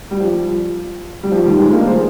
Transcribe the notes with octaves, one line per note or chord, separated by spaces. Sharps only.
G3
F3
G3
F3
D#3 G3
F3 G#3
A#3 D4
G#4 C5